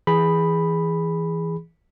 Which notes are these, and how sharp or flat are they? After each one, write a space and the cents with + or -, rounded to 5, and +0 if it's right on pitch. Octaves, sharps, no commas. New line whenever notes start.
E3 +0 G#4 -5 B5 +0